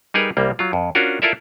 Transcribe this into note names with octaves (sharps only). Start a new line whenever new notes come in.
G3 D#4 G#4 A#4 B4
C2 G3 A#3
F#3 F4
F2
C#4 D4 F4 F#4 A#4
E4 F4 A4 A#4 D5 E5